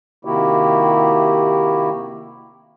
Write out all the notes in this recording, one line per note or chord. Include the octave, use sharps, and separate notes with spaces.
C3 D#3 A#3 E4 F#4 G4